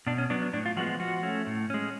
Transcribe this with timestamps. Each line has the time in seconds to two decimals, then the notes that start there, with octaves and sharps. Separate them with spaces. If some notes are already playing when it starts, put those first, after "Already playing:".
0.07 B2 D4
0.18 C#4
0.30 F#3 B3 D4
0.42 D4
0.53 A2 D4
0.66 F4
0.77 F3 G#3 B3 F#4
1.00 F3 F#4
1.23 A3 C#4
1.47 A2
1.70 G#3 C#4